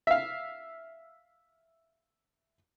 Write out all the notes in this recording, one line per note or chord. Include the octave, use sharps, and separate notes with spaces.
E5 F5